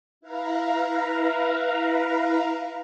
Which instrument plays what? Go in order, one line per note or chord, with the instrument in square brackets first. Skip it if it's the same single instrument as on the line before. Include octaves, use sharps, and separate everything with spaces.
[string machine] E4 B4 F5 A#5